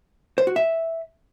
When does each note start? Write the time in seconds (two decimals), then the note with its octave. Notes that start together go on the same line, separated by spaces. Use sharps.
0.38 C5
0.47 F#4
0.56 E5